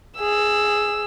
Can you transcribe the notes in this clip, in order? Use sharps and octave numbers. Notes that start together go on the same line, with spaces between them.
G#4 E6